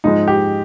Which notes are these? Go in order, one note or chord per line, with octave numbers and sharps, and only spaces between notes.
G#2 F3 G#3 D#4
G4